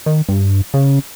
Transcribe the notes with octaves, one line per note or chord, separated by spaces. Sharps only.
D#3
G2
C#3